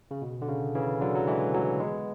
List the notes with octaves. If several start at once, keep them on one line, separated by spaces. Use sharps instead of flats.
C#3
B2
D3
C#3
C#3 E3
D3 F#3
F#3
E3 G#3
F#3 A3
G#3 B3